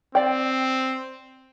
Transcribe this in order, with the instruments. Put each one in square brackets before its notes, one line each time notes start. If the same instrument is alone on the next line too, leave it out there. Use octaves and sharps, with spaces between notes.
[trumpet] C4 [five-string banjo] D5 G5